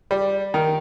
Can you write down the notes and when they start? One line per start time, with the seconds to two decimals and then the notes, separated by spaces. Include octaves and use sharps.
0.11 G3
0.54 D#3